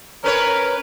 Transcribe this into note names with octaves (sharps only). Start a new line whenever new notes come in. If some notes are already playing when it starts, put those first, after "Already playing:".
C#4 A#4 B4 C#5